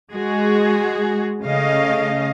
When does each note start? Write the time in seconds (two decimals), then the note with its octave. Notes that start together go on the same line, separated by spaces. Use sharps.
0.13 G#3 F#4 G#4
1.42 C#3 A3 D#5 F5